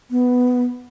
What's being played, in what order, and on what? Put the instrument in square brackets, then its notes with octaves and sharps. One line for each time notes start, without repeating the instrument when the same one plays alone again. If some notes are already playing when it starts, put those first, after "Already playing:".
[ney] B3